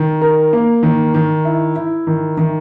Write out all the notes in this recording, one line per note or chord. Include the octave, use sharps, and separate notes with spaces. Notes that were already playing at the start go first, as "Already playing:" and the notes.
Already playing: D#3
A#4
A#3
D#3
D#3
E4
E4
D#3
D#3